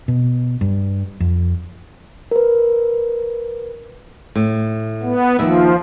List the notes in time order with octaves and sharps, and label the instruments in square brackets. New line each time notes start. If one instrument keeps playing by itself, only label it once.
[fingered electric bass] B2
G2
F2
[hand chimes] A#4 B4
[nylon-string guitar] A2
[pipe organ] B3
[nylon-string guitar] D#2 E5 [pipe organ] F3